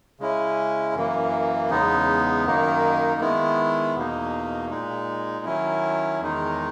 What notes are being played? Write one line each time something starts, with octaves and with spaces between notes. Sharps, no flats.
C#3 G#3 C#4 E4
F#2 E3 A#3
E2 C#3 G#3 B3 D#4
F#2 D#3 A#3 D#4
D#3 G#3 B3 E4
E2 B2 A#3 D#4
A#2 G#3 D#4
D#3 F#3 C#4 E4
E2 D#3 G#3 D#4